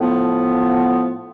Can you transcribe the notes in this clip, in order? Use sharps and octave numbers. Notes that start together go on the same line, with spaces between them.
A2 F3 B3